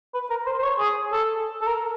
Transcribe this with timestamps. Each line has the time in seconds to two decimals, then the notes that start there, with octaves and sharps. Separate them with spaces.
0.14 B4
0.30 A#4
0.46 C5
0.59 C5
0.63 C#5
0.79 G#4
1.12 A4
1.61 A4
1.67 A#4